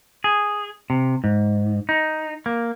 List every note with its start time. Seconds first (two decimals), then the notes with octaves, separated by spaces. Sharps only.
0.24 G#4
0.90 C3
1.24 G#2
1.89 D#4
2.46 A#3